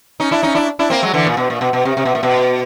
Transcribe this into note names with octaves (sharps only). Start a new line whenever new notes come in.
C#4 D#4
D4 E4
C#4 D#4
D4 E4
D4 E4
A#3 C4
F#3 G#3
D3 E3
A#2
B2
A#2
B2
B2
C3
C3
B2
A#2
B2